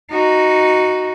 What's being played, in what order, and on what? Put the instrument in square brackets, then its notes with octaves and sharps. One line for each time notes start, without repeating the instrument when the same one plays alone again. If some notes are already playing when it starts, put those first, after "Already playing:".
[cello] D#4 F#4